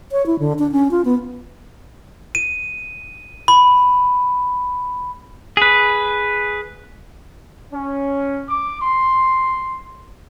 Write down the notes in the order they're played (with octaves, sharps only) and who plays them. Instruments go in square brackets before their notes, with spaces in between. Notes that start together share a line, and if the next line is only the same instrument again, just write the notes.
[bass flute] C#5
E4
D3
D4
C#4
F4
B3
[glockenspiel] D#7
B5
[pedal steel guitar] G#4 B4
[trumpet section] C#4
D6
C6